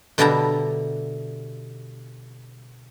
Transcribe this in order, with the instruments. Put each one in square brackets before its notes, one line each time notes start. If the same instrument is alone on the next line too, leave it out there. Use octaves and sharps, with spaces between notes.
[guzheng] B2 D3 G3 E4 A5 A#5